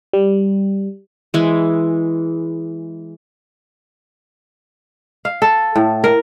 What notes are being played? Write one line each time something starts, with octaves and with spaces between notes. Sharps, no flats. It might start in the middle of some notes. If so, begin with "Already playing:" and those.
G3
E3 G#3
F5
A4
A2
A#4